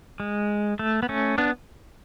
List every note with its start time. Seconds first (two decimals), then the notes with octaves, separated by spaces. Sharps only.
0.20 G#3
0.79 A3
1.03 B3
1.09 A3 C#4
1.38 B3 D4